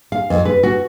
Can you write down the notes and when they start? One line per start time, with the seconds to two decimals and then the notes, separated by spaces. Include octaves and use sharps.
0.12 F5
0.30 F2
0.45 B4
0.63 F#4